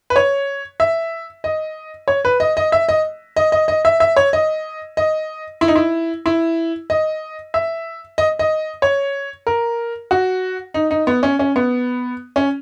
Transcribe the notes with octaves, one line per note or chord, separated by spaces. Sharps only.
B4
C#5
E5
D#5
C#5
B4
D#5
D#5
E5
D#5
D#5
D#5
D#5
E5
E5
C#5
D#5
D#5
E4
D#4
E4
E4
D#5
E5
D#5
D#5
C#5
A#4
F#4
D#4
D#4
B3
C#4
C#4
B3
C#4